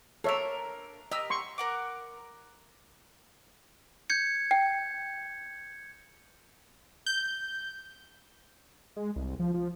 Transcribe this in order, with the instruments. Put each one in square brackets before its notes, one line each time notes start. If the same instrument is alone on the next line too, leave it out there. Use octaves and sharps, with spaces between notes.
[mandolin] A#3 D4 A#4 [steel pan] A4 C#5 E5
[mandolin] G4 A#4 E6 [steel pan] D#5
[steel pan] C6 C#6
[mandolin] A#4 F#5 D6
[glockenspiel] G6 G#6 C#7
[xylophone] G5
[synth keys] G6
[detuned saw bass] G#3
C2
F3
F3